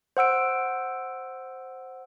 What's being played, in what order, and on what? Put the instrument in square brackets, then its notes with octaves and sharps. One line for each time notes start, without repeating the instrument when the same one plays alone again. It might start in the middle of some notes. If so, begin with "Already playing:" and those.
[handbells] C5 F#5 E6 D7